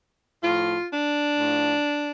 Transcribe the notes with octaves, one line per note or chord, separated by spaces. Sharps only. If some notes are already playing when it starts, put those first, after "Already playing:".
A2 F3 F4
D4
A2 F3